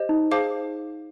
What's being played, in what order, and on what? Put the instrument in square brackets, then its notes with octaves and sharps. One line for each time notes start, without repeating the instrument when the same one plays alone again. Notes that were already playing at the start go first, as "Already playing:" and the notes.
Already playing: [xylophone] G4 C5 D#5
[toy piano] D#4
[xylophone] G#4 C5 F5 A5 D6